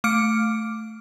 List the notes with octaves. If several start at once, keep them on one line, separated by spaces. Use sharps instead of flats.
A3 D6 F6 C#7 D7